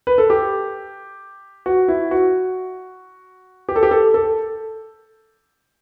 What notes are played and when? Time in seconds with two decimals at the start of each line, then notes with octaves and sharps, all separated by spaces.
0.07 B4
0.18 A4
0.30 G4
1.66 F#4
1.88 E4
2.11 F#4
3.69 G4
3.76 A4
3.83 G4
3.91 A4
4.14 A4